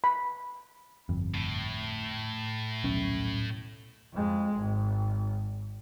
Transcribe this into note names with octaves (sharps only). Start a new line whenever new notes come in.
B5
G1 F2
A2
D#1 B1 C#4
F2 G#3
G#1